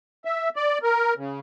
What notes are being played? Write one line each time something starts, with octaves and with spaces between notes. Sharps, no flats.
E5
D5
A#4
C#3